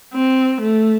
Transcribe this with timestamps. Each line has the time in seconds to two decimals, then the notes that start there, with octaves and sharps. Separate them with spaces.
0.14 C4
0.61 A3